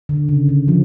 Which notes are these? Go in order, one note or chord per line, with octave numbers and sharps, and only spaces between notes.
D3
C#3
D3
F3